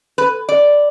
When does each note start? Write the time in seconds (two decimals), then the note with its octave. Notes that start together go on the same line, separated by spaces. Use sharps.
0.18 B4
0.49 D5